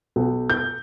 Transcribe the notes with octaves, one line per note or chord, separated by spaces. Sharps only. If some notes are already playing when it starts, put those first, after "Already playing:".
B1
G6